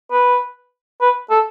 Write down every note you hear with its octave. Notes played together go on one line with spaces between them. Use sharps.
B4
B4
A4